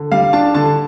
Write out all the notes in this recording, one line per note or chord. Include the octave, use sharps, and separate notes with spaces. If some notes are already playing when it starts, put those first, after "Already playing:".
Already playing: D3
G3 F5
D4 A5
D3 A5